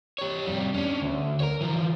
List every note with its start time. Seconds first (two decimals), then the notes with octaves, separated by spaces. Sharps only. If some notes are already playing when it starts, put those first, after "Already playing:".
0.19 G4 C#5
0.45 F2 G3
0.74 C#4 D4
1.02 D2
1.40 A#4 C#5
1.61 E3 F3